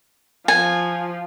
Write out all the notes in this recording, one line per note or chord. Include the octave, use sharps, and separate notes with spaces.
F3 G#5